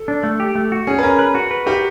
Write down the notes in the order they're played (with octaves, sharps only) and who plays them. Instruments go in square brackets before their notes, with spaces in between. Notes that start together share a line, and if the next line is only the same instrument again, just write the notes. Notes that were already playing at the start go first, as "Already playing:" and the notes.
Already playing: [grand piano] A4
[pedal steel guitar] D4
A3
G4
A3
F#4
[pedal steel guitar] C#4 [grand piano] G#4
[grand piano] B4
[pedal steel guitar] C#4 [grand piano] A#4
[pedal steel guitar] B4
F#4
B4
[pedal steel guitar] F#4 [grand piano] G4